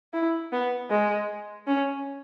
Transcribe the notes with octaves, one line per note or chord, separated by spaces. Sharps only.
E4
B3
G#3
C#4